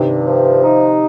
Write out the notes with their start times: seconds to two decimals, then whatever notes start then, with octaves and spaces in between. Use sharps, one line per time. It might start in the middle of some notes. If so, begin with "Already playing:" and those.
Already playing: G2 C3 D#3
0.26 F3
0.64 D#4